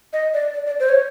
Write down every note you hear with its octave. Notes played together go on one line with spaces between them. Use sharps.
D#5
D5
D5
D5
C5
C#5